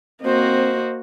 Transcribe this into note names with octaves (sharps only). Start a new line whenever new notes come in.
A#3 C4 F#4 C5 D#5